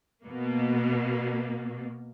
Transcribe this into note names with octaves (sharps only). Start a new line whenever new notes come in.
B2 A#3